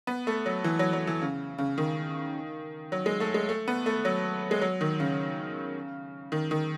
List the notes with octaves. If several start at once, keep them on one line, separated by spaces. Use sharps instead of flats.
B3
A3
F#3
E3
F#3
F#3
E3
C#3
C#3
D#3
F#3
G#3
A3
G#3
A3
B3
A3
F#3
G#3
F#3
D#3
C#3
D#3
D#3